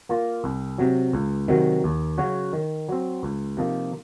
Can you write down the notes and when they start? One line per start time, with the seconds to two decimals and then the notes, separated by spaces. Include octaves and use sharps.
0.09 A#3 F4 A#4
0.44 C2
0.78 C3 F#3
1.13 C#2
1.48 C3 D#3 F#3
1.84 D#2
2.18 C#3 F#3 C#4 F#4
2.53 D#3
2.89 F#3 C4
3.23 C#2
3.57 C3 F3 A#3 D#4